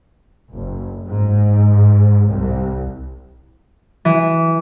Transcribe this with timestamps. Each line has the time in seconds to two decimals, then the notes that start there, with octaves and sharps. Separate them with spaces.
0.53 F#1
1.07 G#2
2.30 C2
4.05 E3